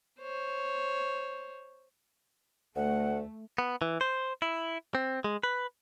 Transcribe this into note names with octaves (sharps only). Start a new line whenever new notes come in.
C5 C#5
D2 A3 F#5
B3
E3
C5
E4
C4
G#3
B4